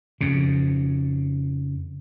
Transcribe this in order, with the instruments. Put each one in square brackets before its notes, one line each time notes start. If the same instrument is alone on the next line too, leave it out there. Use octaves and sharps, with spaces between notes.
[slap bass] F2 C#3